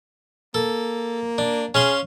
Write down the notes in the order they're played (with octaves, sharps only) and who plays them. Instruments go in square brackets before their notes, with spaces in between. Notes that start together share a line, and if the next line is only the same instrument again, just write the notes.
[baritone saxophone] A#3 [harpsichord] A4
[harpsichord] D4
[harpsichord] C#4 F5 C6 [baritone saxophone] G#4